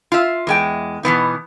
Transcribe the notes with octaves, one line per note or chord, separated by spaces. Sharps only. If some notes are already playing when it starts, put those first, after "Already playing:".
F4 E5
E2 G#3 G5
B2 E3 B3 D#4